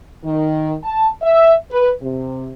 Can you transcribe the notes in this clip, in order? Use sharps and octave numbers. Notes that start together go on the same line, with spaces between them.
D#3
A5
E5
B4
C3